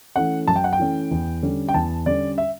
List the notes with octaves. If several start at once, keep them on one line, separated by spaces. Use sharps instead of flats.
E3 A3 C#4 F#5
F#2 A5
G5
F#5
G5
E3 A3 C#4
E2
D3 G3 C#4
G5
E2 A5
D3 G3 C#4 D5
E5